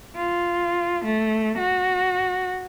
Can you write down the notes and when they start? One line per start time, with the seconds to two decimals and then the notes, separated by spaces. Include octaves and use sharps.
0.16 F4
1.05 A3
1.58 F#4